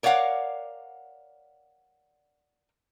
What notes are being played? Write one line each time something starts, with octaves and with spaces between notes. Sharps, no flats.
A#4 C#5 D5 F5 F#5